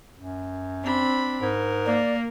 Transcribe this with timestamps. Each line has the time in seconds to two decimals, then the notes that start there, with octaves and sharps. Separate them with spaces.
0.18 F#2
0.83 C4 D4 B5
1.42 G#2 A#4
1.86 A#3 D5